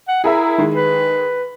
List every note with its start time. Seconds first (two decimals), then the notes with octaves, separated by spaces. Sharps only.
0.08 F#5
0.24 E4 G#4 A#4 E5
0.58 D#3 G#3
0.74 B4